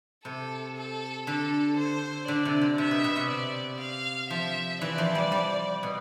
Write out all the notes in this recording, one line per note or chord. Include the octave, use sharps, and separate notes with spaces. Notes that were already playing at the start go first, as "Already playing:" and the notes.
C3 A4
A4
D3 A4
C5
D3 D5
C3
D3
C3 E5
B2
B2
C3
D5
F5
F3 E5
E3 D5
F3
G3
G3
B2